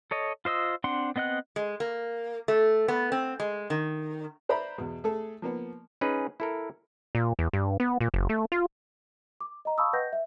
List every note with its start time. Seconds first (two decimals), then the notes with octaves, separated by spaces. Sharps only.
0.11 A4 C#5 D#5
0.45 F4 C5 D#5 E6
0.84 C4 D4 F#5 C6
1.16 B3 C4 D#5 F#5 F#6
1.56 G#3
1.80 A#3
2.48 A3
2.88 B3
3.12 C4
3.40 G#3
3.70 D#3
4.49 B4 C5 D5 E5 A#5 B5
4.78 E2 B2
5.04 A3 G#4 A4
5.42 F3 A#3 B3
6.01 C#4 D#4 G#4 B4
6.40 E4 A4 A#4
7.15 A#2
7.39 E2
7.53 G2
7.80 B3
8.01 A#2
8.14 F#1
8.29 A3
8.52 F4
9.41 D6
9.65 D#5 A#5
9.78 F5 A5 B5 C#6 D#6 E6
9.93 B4 D#5 F#5 G5 G6 A#6
10.13 E5